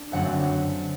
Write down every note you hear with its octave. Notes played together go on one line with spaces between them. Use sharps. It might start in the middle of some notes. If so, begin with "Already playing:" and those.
Already playing: D4
F#2 D3 F#3 A3 C4 F#5